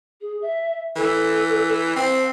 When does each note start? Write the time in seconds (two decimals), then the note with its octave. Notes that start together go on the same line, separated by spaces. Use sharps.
0.21 G#4
0.42 E5
0.96 E3 A4
1.96 C4 C5